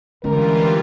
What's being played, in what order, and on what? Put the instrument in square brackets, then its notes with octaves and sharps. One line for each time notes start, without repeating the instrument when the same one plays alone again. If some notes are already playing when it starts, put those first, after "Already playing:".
[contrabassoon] C#2 [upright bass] D3 [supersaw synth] E3 G3 F4 [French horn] A#4